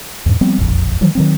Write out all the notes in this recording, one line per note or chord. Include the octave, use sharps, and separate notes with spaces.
E2 G#2
F3 G3 B3 C4
E1 A#1 F2
D#3 E3 F#3 G3
D#3 F#3 C4